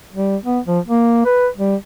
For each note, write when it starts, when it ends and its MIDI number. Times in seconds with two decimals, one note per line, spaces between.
0.13 0.37 55
0.45 0.59 59
0.67 0.79 53
0.88 1.24 58
1.25 1.48 71
1.57 1.76 55